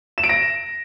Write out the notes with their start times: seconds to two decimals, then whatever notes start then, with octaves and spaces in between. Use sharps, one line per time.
0.18 E7
0.24 D7
0.29 A#6